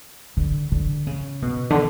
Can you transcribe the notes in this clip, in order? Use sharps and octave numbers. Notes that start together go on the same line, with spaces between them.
D3
D3
C#3
B2
D3